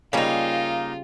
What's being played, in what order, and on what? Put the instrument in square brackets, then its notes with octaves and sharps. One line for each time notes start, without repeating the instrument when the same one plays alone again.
[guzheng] C#3 G3 C#5 [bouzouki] A#3 D#4 [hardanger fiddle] F4